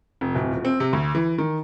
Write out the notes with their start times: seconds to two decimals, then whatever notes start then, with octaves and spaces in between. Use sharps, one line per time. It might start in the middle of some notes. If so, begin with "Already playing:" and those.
0.21 F1
0.35 D1
0.51 D#1
0.65 C4
0.80 C3
0.93 D2
1.15 E3
1.38 D#3